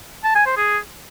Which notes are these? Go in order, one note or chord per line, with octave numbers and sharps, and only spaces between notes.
A5
G#5
C5
G#4